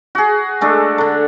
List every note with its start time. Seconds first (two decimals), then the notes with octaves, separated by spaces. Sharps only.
0.15 F#4 G#4
0.61 G#3 A3 D4 A4
0.98 D3 A3